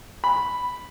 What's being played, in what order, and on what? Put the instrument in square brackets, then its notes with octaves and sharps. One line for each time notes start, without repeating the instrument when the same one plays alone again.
[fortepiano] B5